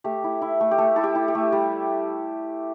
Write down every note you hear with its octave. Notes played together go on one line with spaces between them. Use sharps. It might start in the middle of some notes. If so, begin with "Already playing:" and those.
A3 G4
E4
E4
A3
G4
A3 A4
E4 A4
G4
E4
G4
A3
G3